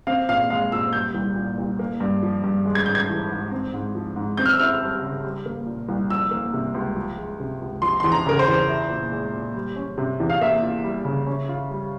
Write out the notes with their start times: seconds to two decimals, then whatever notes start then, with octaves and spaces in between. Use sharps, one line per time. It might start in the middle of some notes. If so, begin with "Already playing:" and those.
0.07 C4 F5
0.29 A#2 F5
0.50 G#3 F5
0.72 A#2 E6
0.93 G3 G6
1.14 C2
1.36 A#2
1.58 C2
1.79 A#3
2.00 G2
2.23 F3
2.44 G2
2.66 G#3
2.75 G#6
2.86 G#2 G6
2.95 G#6
3.09 E3
3.31 G#2
3.51 C4
3.73 G#2
3.95 F3
4.16 G#2
4.37 C4 G6
4.46 F6
4.52 E6
4.60 E4 F6
4.81 G3
5.02 C#3
5.24 G3
5.46 A#3
5.66 A#2
5.89 C2
6.10 F3 E6
6.31 A#3
6.53 C3
6.74 C#2
6.96 F3
7.17 G#3
7.40 C3
7.61 C#2
7.82 F3 C6
8.00 E2 C6
8.12 A#5
8.26 C#3 A#4
8.39 C5
8.48 E2
8.68 E4
8.89 A#2
9.12 G#3
9.33 A#2
9.54 G3
9.76 C#4
9.98 C3
10.20 E2
10.30 F5
10.41 A#3 E5
10.63 F4
10.84 G3
11.05 C#3
11.27 C#4
11.49 F4
11.71 G3